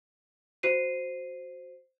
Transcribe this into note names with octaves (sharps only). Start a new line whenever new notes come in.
F#4 C5 C7 D#7